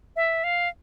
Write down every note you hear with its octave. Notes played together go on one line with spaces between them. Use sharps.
E5
F5